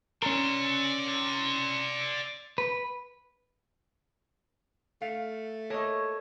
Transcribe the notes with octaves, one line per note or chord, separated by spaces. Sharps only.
C#4 A#4 D5 C6
B4
A3 F5
A#3 A4 A#4 C#5 D#5 E5 A5